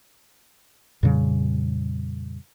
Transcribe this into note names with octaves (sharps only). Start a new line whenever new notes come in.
F2 A#2 C#3 G3